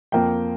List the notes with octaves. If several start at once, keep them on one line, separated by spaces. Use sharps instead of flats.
F2 F3 A#3 G5